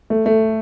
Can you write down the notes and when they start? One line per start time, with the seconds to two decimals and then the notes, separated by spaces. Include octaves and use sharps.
0.10 A3
0.26 A3